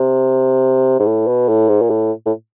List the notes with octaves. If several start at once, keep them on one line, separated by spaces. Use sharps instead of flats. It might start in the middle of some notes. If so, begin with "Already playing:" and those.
Already playing: C3
G#2
A2
B2
A2
G#2
A#2
A2
A2